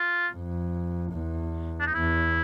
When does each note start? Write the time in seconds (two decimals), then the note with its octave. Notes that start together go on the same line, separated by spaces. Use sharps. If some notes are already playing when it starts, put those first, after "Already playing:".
Already playing: F4
0.32 F2
1.13 E2
1.80 D4
1.87 D#4
1.94 E2 E4